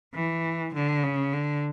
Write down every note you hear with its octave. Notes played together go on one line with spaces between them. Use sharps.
E3
D3
C#3
D3